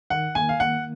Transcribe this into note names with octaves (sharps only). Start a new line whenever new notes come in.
D#3 F#5
A#3 G#5
F5
A#3 F#5